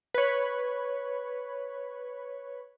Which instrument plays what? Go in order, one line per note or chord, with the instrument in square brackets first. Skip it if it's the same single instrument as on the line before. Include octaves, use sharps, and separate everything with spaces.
[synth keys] B4 C#5